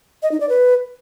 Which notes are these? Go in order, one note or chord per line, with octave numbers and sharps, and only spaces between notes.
D#5
D#4
D5
B4